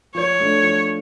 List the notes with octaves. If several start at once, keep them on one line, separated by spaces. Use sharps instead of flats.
F3 C#5
A3 D4
F3